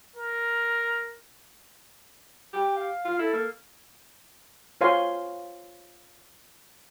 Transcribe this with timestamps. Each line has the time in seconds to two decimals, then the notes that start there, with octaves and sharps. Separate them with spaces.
0.16 A#4
2.53 G4 G5
2.76 F5
3.05 F4
3.19 E4 A4
3.33 A#3
4.81 F4 C5 C#5 F5 G#5 C6